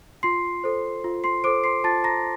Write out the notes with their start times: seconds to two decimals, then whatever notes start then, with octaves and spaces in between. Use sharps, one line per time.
0.23 F4 C6 C7
0.64 A4 C5
1.04 F4
1.24 C6 C7
1.44 A4 C5 D6 D7
1.64 C6 C7
1.84 F4 A5 A6
2.04 A#5 A#6